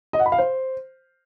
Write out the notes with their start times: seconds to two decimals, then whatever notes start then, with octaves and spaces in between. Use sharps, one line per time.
0.13 D#5
0.20 F#5
0.26 B5
0.32 F5
0.38 C5